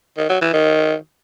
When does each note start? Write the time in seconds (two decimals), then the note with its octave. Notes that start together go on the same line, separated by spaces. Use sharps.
0.17 D#3
0.29 F#3
0.41 E3
0.53 D#3